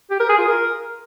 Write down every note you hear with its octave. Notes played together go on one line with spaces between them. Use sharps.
G4
A#4
G#4
F4
A#4